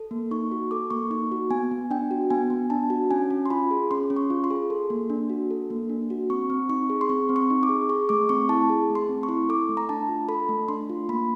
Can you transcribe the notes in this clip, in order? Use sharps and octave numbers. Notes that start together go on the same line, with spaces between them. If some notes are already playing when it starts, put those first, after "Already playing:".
Already playing: A4
A#3
D#4 C#6
F#4
A4 D6
A#3 C#6
D#4 C#6
F#4
B3 G#5
B3
D4 G5
F#4
B3 G#5
B3
D4 A5
F#4
C#4 G#5
C#4
C6
F4 B5
G#4
C#4 C6
C#4
C#6
F4
C6
G#4
A4
A#3
D4
F#4
A4
A#3
D4
F#4
C4 C#6
C4
D#4 C#6
G#4
C6
C4 C#6
C4
C#6
D#4
D6
G#4
G#4 C#6
A3 D6
C4 C#6
E4 A5
G#4
A3
C6
C4
C#6
E4
A4 D6
A3
A#5
D4 A5
F4
A4 B5
A3
D4 C6
F4
A#3 B5